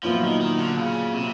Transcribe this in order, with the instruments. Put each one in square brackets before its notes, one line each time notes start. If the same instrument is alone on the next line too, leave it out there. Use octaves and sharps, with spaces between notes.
[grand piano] A#2 F#3 B3 E4 [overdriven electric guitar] F3
[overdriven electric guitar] D#3
D#3
D3
C#3
C3